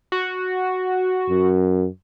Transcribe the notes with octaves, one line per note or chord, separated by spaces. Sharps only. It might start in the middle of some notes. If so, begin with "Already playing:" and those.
F#4
F#2